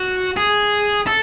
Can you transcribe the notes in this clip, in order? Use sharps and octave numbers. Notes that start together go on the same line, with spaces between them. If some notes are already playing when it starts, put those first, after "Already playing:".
Already playing: F#4
G#4
A4